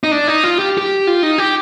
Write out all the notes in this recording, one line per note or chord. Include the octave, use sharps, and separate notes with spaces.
D#4
D4
D#4
F4
G4
G4
F4
D#4
G4